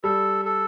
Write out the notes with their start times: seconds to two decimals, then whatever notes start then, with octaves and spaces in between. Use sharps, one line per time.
0.04 G3 A4
0.45 A4